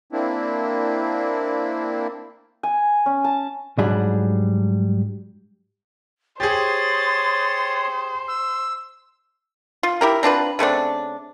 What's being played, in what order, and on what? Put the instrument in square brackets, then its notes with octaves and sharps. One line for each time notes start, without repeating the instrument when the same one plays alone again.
[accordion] A#3 C4 D4 E4
[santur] G#5
C#4
A5
[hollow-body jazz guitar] G#2 F#3 G3 D4 G#4 B5
[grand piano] G4 G#4 [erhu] C5 [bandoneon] C#5 C6 D#6 [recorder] A6
[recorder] E6
[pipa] F4
E4 G4 A#4
C4 D4 F4 B4
C#3 A3 C4 D4